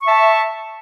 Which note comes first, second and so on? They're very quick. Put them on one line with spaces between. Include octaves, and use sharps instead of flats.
C#6 E5 A5